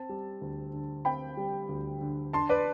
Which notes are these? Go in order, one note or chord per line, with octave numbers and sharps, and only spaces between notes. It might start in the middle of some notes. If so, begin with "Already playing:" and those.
Already playing: C4 A5
G3
D2
D3
C4 G5 B5
G3
D2
D3
D4 A5 C6
B4 D5